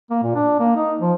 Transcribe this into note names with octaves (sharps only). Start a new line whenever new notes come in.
A#3
A#2
D4
A#3
D#4
F3